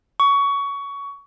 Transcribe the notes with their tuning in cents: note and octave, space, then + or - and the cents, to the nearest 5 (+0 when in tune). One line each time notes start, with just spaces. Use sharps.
C#6 +20